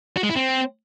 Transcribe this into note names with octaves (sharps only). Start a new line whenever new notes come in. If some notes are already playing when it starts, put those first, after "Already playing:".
F#4
G#3
E4
C4